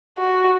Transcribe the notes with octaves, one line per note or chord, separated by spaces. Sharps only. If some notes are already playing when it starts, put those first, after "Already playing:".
F#4